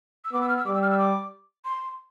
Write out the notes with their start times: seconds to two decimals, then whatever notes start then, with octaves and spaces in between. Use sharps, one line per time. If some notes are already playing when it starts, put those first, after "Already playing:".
0.25 E6
0.32 B3 D6
0.42 E6
0.49 F6
0.57 E6
0.66 G3 D6
0.74 E6
0.82 F6
0.90 E6
0.98 D6
1.65 C6